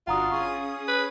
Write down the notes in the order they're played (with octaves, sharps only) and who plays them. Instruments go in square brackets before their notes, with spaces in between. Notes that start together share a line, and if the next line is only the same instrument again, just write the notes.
[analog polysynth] G1 D4 F#4 [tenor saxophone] F4 [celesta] F#5 A#5 D#6
[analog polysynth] C#4 G#4 D#6 [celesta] C#6
[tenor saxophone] B4